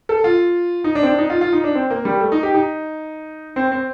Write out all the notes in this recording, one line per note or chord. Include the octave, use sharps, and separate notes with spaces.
A4
F4
D#4
D4
C4
D4
D#4
F4
F4
D#4
D4
C4
A#3
G3
A3
D#4
G4
D#4
C4
C4